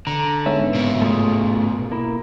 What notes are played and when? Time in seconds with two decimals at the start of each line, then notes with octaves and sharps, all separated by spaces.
0.07 D3 A#5
0.46 G#2 B3 C#4 E5
0.75 B2 A#3
1.02 A3 F4 G#4
1.92 A#3 E4